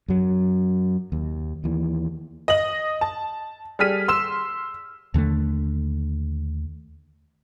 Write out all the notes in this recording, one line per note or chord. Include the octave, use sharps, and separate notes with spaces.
F#2 F#3
D#2
D#2 E3
D#5 F#7
A5
G3 G#4 A4 F6 B6 D#7
C6 E6 E7
D#2 D3 G3 A3